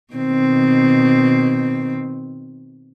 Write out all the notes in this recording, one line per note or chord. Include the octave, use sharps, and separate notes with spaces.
B2 D#3 C4